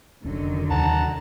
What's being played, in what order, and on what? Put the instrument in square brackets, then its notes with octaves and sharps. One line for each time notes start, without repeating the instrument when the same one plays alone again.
[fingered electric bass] F1 C#4 D4 [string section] D3 D#3 F#3
[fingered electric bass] D#2 C3 [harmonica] F#5 A5 A#5